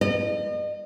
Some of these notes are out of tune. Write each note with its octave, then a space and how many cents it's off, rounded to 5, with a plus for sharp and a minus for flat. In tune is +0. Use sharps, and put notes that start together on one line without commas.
D#5 -40